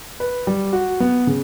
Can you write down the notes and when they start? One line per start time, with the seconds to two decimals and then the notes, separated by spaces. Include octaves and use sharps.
0.20 B4
0.47 G3
0.73 F#4
1.00 B3
1.27 C#3